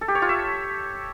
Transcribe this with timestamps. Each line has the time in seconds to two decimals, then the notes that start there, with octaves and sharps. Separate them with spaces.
0.01 A4
0.08 G4
0.15 C#5
0.22 F4
0.29 E5